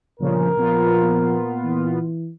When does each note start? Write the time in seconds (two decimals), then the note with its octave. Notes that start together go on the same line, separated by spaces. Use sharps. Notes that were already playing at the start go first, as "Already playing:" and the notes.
0.20 G1 A#2 C#3 F3 A#4
0.57 A#2 F3 B3 F4
1.64 E3